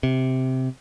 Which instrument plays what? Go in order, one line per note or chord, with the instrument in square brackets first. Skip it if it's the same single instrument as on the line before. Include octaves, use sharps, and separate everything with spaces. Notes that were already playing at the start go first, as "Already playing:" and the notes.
[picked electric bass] C3